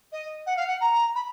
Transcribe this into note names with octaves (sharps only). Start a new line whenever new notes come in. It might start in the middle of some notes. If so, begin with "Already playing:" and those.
D#5
F#5
F5
F#5
A#5
B5